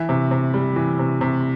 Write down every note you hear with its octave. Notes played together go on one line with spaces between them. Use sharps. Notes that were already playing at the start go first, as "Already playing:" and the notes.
Already playing: E3 E5
C3
C3
G3
E3
C3
C3